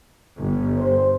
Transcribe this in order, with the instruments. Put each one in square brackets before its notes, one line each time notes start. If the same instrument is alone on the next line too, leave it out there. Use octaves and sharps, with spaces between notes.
[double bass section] G1
[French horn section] C5